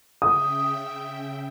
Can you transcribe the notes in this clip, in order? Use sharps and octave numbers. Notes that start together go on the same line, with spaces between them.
C#3 E5 G5 D#6